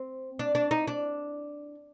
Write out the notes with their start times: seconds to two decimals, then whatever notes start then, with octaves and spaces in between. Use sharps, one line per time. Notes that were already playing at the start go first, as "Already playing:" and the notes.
Already playing: C4
0.39 D4
0.55 D4
0.71 D#4
0.88 D4